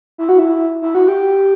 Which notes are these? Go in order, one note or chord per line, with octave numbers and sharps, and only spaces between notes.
E4
F#4
E4
E4
F#4
G4